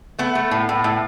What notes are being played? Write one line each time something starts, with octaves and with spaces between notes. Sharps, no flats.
A3 B3
A3
A2
A2
A2